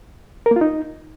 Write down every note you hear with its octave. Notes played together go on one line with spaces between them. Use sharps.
A#4
A#3
F4
D#4